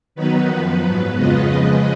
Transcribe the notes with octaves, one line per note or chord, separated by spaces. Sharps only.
D#3 F#3 B3 D#4 B4
F#2 F3 B3
G#2 F#3 B3
F2 C#3 G#3 B3 F4 B4 D#5
C#3 F3 G#3